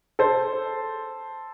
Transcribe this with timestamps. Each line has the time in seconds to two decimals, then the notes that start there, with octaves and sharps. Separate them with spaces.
0.19 A4 C5